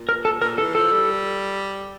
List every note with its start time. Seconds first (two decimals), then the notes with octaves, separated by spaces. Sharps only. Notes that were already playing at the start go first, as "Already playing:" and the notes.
Already playing: A#2
0.09 A#4
0.25 A4
0.41 A#2 A#4
0.58 E3 A4
0.75 F3 A4
0.92 G3